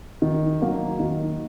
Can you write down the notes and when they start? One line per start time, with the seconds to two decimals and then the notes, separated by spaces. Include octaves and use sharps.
0.22 D#3
0.61 F#3 A#3 D#4
0.99 D#3